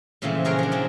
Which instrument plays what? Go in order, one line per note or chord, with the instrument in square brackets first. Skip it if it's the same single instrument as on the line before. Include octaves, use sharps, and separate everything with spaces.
[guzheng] A#2 C#3 E3 F3 A3 C4
F#4 G#4 A#4 C#5 G5
F3 D4
E3 F#3 C4